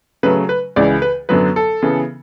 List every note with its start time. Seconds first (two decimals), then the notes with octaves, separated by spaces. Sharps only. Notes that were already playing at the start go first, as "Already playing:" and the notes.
0.23 C#3 F#3 A3 B4
0.49 B4
0.76 C#2 C#3 E3 D5
1.02 B4
1.29 F#2 D3 F#3 B3 B4
1.56 A4
1.82 C#3 E3 B3